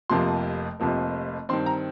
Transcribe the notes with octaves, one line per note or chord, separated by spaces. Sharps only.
F1 F2 C3 F3 A#3 C6
F1 F2 C3 F3 A#3
G2 D#3 C4 C6
A#5